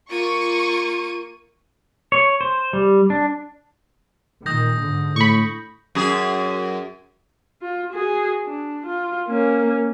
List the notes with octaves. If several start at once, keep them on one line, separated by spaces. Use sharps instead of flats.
A#3 F4 C#6 D#7
C#5
C5
G3
D4
A#2 D#3 D#6 G6 A#6
G#2 D3
A2 B5 C#6
F#2 G#4
F4
F#4 G#4
D4
F4
A#3 C#4